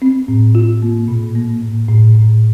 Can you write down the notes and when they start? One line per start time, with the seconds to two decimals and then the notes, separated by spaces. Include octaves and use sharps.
0.02 C4
0.28 A2
0.55 F4
0.82 A#3
1.08 A#2
1.35 A#3
1.62 A2
1.88 A2
2.15 A2